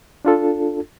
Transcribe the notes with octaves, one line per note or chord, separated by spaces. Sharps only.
D4 F4 A4